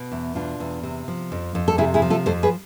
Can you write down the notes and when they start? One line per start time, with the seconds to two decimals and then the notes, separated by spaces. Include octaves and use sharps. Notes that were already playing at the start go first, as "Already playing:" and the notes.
Already playing: B2
0.12 E2
0.35 B2 D4 F4
0.60 E2
0.83 C3
1.08 F3
1.32 F2
1.55 F2
1.68 A4
1.78 C3 E4 G#4
1.94 E4 G#4
2.02 F3
2.10 F4 A4
2.26 F2 A4 C5
2.43 G#4 B4